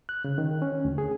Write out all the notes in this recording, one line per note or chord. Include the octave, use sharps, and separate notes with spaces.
F#6
C#3
D#3
C#4
D2
G#4